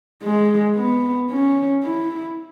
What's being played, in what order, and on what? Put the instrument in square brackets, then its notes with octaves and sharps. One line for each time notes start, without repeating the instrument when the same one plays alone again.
[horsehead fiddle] G#3
B3
C#4
E4